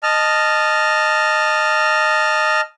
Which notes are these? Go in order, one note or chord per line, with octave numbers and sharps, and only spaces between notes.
D#5 A5 F6